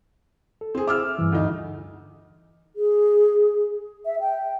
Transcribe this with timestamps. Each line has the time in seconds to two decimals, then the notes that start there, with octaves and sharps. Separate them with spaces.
0.61 A4
0.75 C4 G#4
0.87 E5 D6 E6 F6
1.19 G2 E3
1.32 D2 D#4
2.76 G#4
4.06 E5
4.20 G5